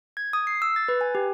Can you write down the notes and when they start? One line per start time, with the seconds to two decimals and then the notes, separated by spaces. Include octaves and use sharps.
0.17 G#6
0.33 D#6
0.47 C7
0.62 E6
0.76 A6
0.88 B4
1.01 G#5
1.15 G4